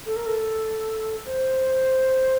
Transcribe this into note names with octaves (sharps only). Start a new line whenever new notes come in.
A4
A#4
A4
C5